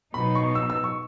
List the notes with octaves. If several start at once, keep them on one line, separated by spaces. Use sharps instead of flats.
B2 F#3 B3 D#4 B5
C#6
E6
E6
C#6